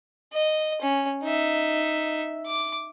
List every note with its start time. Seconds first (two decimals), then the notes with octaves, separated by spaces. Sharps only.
0.33 D#5
0.81 C#4
1.23 D#4 E5
2.46 D6